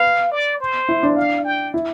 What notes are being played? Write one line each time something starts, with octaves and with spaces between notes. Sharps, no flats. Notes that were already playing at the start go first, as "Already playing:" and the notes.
Already playing: B4 F5
D5
C5
E4
D4
F5
G5
E4